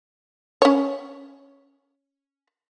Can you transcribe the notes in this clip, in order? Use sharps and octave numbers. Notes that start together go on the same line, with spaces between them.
C#4 C#5